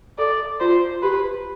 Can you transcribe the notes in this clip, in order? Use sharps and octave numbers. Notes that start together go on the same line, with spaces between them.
A4 D5
F4 C5
G4 B4